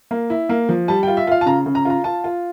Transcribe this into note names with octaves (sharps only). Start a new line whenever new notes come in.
A#3
E4
A#3
F3
G3 A5
F4 G5
E5
F4 F5
A5
C#3 A#5
C#3
A#5
F4 A#5
F4 A5
F4